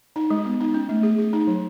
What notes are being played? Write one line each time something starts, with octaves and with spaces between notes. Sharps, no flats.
D#4
G#3
B3
D#4
C#4
A3
G#4
G#4
D#4
F#3